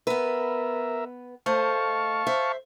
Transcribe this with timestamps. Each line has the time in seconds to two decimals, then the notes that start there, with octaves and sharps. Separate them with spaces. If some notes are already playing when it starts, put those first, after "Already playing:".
0.07 B3 A#4 B4 E5
1.46 A3 C5 D#5 F5 A5 C#6
2.27 C5 E5